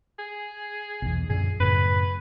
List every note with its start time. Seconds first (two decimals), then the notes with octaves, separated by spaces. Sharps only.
0.19 G#4
1.02 B1 E2
1.30 F#2 A#2 D3 G#4
1.60 F#2 A2 C#3 B4